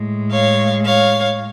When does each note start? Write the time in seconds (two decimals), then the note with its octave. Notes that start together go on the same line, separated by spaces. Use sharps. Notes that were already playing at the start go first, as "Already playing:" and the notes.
Already playing: A2 G#3
0.31 C#5 F5
0.85 C#5 F5